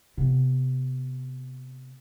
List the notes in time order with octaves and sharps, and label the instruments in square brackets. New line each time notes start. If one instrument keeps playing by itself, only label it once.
[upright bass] C3 B3